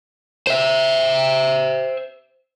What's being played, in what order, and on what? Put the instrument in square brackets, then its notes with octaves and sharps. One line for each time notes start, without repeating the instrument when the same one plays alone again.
[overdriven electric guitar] C5 E5